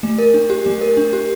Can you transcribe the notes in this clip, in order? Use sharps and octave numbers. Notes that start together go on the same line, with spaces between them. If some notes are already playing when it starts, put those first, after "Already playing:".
A3
A#4
D4
G4
A3
A#4
D4
G4